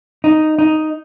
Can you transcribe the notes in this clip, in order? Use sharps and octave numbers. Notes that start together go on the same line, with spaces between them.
D#4
D#4